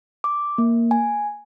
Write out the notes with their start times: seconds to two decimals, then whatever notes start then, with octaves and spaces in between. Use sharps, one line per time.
0.24 D6
0.58 A#3
0.91 G#5